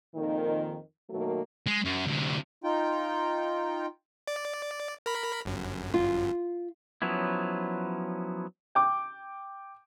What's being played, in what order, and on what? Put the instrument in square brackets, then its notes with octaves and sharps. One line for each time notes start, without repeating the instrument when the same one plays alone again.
[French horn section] F2 A#2 D#3
B2 D#3 F#3 A3 A#3
[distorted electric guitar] G#3
F#2
D2 C3
[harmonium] D#4 F4 G5
[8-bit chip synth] D5
A#4 B5
G1 F#2
[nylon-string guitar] F4
[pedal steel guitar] F3 F#3 B3 C#4 E4
[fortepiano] G5 D6